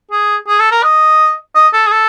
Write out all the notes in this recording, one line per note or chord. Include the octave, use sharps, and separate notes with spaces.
G#4
G#4
A4
A#4
D#5
D#5
A4
G#4
A4